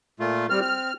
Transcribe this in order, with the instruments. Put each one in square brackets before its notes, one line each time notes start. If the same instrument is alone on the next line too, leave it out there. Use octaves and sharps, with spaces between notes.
[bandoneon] A#2 A3 F4
[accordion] G3 F6 [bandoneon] C4
[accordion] F6